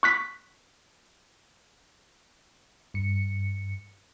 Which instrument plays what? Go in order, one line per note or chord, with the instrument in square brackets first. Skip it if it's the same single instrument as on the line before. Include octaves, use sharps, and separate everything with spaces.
[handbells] C#6 F#6 B6
[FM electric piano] G2 C#7